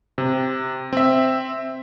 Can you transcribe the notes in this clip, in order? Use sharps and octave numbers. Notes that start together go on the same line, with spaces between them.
C3
C4 E5